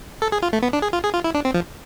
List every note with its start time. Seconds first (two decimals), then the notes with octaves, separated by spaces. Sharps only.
0.22 A4
0.32 G#4
0.42 F4
0.53 A3
0.63 B3
0.73 D4
0.82 G#4
0.93 F4
1.04 G#4
1.14 F4
1.24 E4
1.34 D4
1.45 C4
1.54 F3